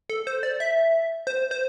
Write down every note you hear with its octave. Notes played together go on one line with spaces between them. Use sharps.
A4
C5
D5
E5
C5
C5